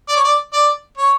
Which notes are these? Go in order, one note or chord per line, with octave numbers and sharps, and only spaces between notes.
D5
C#5
D5
D5
C#5